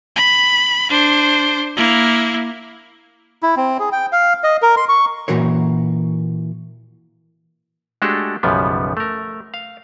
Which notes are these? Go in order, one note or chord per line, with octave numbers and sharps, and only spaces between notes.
B5
D4 C5
A#3 E4
E4
C4
G#4
G5
F5
D#5
A#4
C6
C#6
A#2 D#3 E3 F#4 A#4 C#5
G#3 A3 D4 F#4 G4 A4
B1 F#2 C#3 F3 G3 B3
A3 A#4
F5